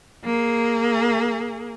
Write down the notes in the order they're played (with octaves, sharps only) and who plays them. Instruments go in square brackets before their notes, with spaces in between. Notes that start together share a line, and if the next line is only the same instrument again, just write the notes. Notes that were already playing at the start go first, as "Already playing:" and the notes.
[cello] A#3 G#4